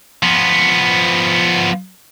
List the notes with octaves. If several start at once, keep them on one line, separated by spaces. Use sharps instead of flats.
F3 B3